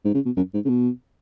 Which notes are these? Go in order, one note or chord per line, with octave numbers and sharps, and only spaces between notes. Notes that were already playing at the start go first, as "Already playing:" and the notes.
G#2
C#3
B2
F#2
G#2
C#3
B2